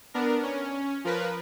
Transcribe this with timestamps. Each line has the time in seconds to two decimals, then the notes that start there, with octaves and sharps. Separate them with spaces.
0.14 B3 D4 A#4
0.43 C#4
1.04 F3 A#4 B4